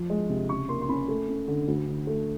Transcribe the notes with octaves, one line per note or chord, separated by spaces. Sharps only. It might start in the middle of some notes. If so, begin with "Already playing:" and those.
Already playing: F3
G#3
C3
C#3 C#6
A#3 C6
C6
C#4 B5
A3
C#4
D3
D2
D3
A3